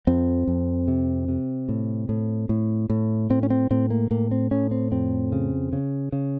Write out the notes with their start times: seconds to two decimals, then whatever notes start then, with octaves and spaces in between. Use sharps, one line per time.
0.07 F2 C4
0.47 F2
0.88 C3
1.28 C3
1.69 A2
2.09 A2
2.49 A2
2.90 A2
3.30 A2 C4
3.43 C#4
3.50 C4
3.71 A2 C4
3.90 A#3
4.11 A2 A#3
4.31 C4
4.51 A2 C#4
4.71 C4
4.92 F2 C4
5.32 C#3
5.73 C#3
6.12 C#3